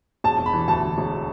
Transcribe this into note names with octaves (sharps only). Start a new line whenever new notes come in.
E1 A5
E1
B5
E3
D2 A5
E3
E1